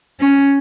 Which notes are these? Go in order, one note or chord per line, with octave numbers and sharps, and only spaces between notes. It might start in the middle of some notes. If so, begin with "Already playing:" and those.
C#4